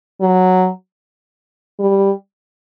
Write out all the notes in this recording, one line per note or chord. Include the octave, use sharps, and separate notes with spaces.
F#3
G3